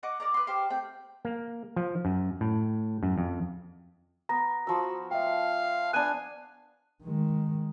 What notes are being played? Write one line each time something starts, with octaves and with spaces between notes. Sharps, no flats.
D#5 F#5 C#6 D6
A#4 D5 A#5
B4 C6
G4 C5 F5
A3 C4 G5
A#3
F3
F#2
A2
F#2
F2
B3 A#5 A#6
F3 F#4 E6
E5 F5 G5
B3 D4 G#5 F#6 D#7
D#3 G#3